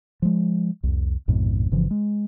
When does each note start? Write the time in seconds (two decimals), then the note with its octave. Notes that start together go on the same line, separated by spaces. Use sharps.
0.22 F3 G#3
0.83 C2 F2
1.28 A#1 F2 G#2 B2
1.71 G1 C#3 E3 F3
1.91 G#3